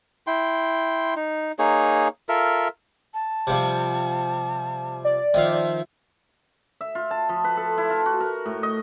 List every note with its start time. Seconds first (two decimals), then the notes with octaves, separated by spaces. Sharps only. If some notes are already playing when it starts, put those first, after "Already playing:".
0.27 E4 G5 C6
1.16 D#4
1.59 A#3 D#4 G#4 C#5
2.29 F4 A4 A#4 E5
3.14 A5
3.47 C3 F3 G3
5.05 D5
5.34 D#3 F3 E5 F5
6.81 E5
6.95 F4
7.11 A5
7.29 F3
7.44 B4
7.57 A4
7.78 E4
7.90 F4
8.06 F#4
8.20 A#4
8.45 A2
8.63 D#5